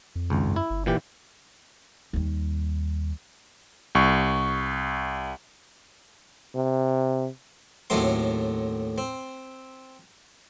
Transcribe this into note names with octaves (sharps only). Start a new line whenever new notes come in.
F2
G#1 C#2
F#2
E4
G1
A#2 E3 G4
D#2 G3
C2 C#6
C3
D#2 A2 F#3 A3 C4 C6
C4